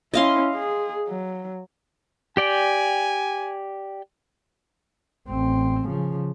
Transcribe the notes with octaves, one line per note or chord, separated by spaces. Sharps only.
C#4 E4 D#5 F5 C6
G#4
F#3
G4 D5 G5 G#5
A1 C4
C#3 F3